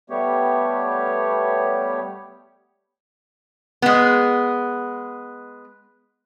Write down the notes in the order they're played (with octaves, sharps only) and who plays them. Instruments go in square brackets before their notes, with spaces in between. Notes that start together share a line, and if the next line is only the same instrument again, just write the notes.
[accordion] G3 A3 B3 G4 C#5
[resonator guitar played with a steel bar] G#3 B3